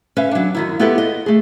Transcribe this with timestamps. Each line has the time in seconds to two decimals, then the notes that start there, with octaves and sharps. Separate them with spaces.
0.16 C#4 B4 E5 F5
0.31 F#3 D4
0.55 F#2 D#3 E4
0.79 B3 E4 F4 G4 A4 B4
0.98 D#5
1.26 A3 G#4